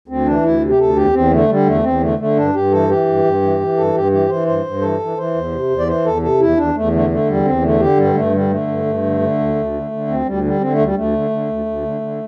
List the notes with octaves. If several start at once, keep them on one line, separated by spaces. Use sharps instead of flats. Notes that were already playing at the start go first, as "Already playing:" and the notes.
D2 C4
E3 D4
D2 E4
C3
G4
D2 A4
E2 G4
E2 C4
D3 A3
D3 G3
E2 A3
E2 C4
D3 A3
D3 A3
G2 D4
G2 G4
E3 A4
E3 G4
G2
G2
E3
E3
G2 A4
G2 G4
E3 G4
E3 C5
G2 C5
G2
E3 A4
E3
E3 C5
E2
C3
E2
D5
E3 C5
E2 A4
C3 A4
E2 E4
E2 D4
E2 A3
D3 A3
D3 A3
E2 G3
E2 C4
D3 A3
D3 G4
G2 G3
G2 A3
D3 G3
D3 A3
G2
G2
D3
D3
D2
D2
D3
D3
D2 C4
D2 G3
D3 G3
D3 C4
A3
D2 G3
D2 A3
D3
D3
D2
D2
D3
D3